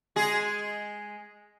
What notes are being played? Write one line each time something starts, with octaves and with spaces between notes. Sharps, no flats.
G#3 G#4